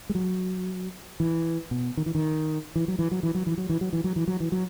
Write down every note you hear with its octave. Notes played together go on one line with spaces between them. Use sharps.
G#3
F#3
E3
B2
D#3
E3
D#3
E3
F#3
E3
F#3
E3
F#3
E3
F#3
E3
F#3
E3
F#3
E3
F#3
E3
F#3